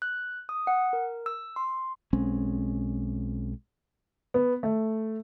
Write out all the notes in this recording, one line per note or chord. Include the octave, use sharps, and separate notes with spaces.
F#6
D#6
F#5
A#4
E6
C6
B1 G#3 C4 C#4
B3
A3